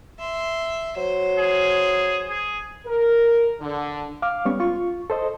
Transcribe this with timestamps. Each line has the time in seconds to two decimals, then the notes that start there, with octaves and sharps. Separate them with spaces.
0.19 E5 C6
0.97 F#3 C5
1.39 G#4
2.30 G#4
2.86 A#4
3.60 D3
4.22 F5 D6 F6
4.45 G3 B3 C#4 C#6
4.60 F4 C#6
5.10 A4 C5 D#5